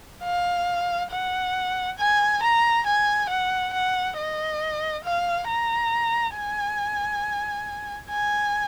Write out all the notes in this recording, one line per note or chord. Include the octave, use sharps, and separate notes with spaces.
F5
F#5
G#5
A#5
G#5
F#5
F#5
D#5
F5
A#5
G#5
G#5